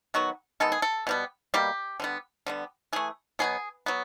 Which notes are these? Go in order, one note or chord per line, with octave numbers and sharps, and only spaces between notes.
D#3 F#3 B3 F#4
D#3 G#3 B3 A4
G#4
A4
B2 G3 B3
B2 G3 A#3 G4
D3 G3 B3
D3 G3 B3
E3 A3 G#4
B2 F#3 B3 G#4
F#3 B3